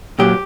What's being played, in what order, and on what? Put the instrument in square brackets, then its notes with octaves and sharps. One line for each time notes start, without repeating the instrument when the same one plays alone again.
[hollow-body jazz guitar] A#2 F#3 G4